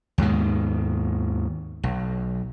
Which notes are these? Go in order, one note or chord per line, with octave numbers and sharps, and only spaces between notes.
D#2 G#2 B2 D#3
B1